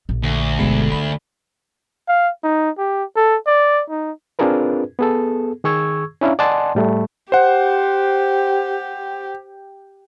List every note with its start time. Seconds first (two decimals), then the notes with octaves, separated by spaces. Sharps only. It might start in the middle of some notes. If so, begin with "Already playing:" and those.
0.09 A#1
0.23 D2
0.58 G1 B2 G#3
0.92 C#2 B3 B5
2.08 F5
2.43 D#4
2.78 G4
3.16 A4
3.46 D5
3.90 D#4
4.39 C4 D4 F4 G#4 A#4 B4
4.99 B3 G#4 A4
5.64 D#3 G#4 C#6 E6 G#6
6.21 C#4 D4 E4 E5 F5 A#5
6.39 D5 D#5 F#5 G#5 A5 C6
6.75 A2 G3 A3
7.32 G4 C5 F#5